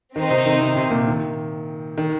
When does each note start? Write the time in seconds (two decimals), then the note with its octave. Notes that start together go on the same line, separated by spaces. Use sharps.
0.15 D#3 C4 D#4 C5
0.30 C3
0.46 D#3
0.61 C3
0.76 C3
0.91 A#2
1.07 D#3
1.97 D#3